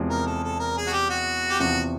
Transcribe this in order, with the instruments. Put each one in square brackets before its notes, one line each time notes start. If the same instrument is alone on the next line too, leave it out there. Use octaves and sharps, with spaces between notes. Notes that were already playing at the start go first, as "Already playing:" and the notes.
Already playing: [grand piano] E2 C3 F3 G#3
[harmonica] A#4
A4
A4
A#4
G#4
F#4
G4
F#4
G4
[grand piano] E2 C3 F3 [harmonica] F#4